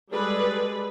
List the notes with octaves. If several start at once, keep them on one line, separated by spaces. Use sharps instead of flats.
G3 G#3 G#4 A4 B4 D5